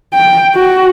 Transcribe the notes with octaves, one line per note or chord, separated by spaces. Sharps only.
G5
F#4